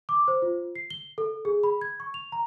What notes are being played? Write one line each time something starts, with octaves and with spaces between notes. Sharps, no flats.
D6
C5
F4
C7
G7
A4
G#4
B5
G#6
C#6
F7
A#5